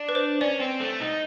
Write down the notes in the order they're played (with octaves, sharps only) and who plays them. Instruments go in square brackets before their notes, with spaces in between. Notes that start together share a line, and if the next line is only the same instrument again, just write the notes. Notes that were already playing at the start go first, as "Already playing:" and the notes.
Already playing: [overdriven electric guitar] D4
[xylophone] B4
C5
[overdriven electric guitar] C#4 [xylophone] D5
[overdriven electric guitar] C4
A3
D#4